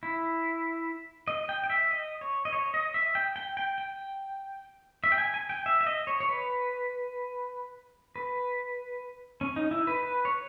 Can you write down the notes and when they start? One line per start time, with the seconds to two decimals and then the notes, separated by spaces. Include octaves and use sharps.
0.03 E4
1.28 D#5
1.49 G5
1.64 G5
1.70 E5
1.91 D#5
2.21 C#5
2.45 D#5
2.53 C#5
2.74 D#5
2.94 E5
3.15 G5
3.36 G5
3.57 G5
3.78 G5
5.04 E5
5.12 G5
5.18 G#5
5.34 G#5
5.50 G5
5.66 E5
5.81 E5
5.86 D#5
6.07 C#5
6.20 C#5
6.29 B4
8.16 B4
9.41 C#4
9.56 D#4
9.71 E4
9.87 B4
10.03 B4
10.25 C#5